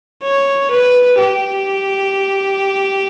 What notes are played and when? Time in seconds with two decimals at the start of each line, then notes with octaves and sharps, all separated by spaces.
0.23 C#5
0.71 B4
1.18 G4